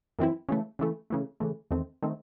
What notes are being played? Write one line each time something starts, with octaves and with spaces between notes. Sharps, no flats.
F#2 E3 C4 E4
C#3 E3 A3
C#3 E3 A3
C#3 E3 A3
C#3 E3 A3
E2 D#3 A3 C4
D#3 A3 C4